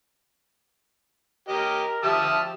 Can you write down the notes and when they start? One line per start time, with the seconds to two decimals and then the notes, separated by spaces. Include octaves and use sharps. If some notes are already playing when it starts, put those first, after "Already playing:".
1.49 G4 A#4 D#5
2.03 F3 G4 E5 A5 D#6 F6